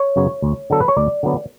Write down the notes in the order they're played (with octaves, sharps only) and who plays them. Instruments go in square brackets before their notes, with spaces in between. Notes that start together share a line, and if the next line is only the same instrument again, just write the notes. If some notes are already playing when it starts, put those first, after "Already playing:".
Already playing: [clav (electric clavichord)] C#5
F#2 C#3 F#3 B3
D2
D3 F#3 B3 A4
B4
C#5
D2 D5
D3 F#3 B3